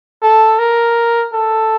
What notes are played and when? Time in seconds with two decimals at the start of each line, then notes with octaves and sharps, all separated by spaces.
0.22 A4
0.59 A#4
1.33 A4